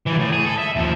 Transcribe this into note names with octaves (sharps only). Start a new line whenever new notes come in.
E3 G3
A2
G#4
A4
E5
D#2 F3